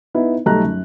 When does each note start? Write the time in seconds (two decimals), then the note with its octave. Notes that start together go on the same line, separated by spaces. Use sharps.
0.14 B3 D#4 E4
0.46 B1 G3 A3 D#4 A#5 F#6
0.64 F#2